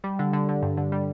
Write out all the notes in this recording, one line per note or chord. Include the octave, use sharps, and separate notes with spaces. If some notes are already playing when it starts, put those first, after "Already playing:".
G3
D3
D3
D3
G2
D3
G3